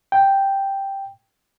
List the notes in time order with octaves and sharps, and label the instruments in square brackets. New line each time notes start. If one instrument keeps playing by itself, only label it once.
[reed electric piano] G5